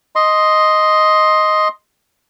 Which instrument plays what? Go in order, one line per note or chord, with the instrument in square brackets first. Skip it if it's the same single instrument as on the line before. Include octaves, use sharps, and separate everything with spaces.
[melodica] D#5 C6